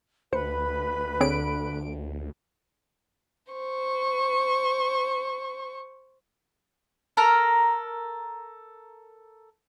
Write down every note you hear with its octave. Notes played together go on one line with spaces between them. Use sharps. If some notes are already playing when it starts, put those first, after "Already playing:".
D2 B4 C5 B5 C#7
D3 C4 G#4 C#5 D7
C5 C#6
A4 A#4 A#5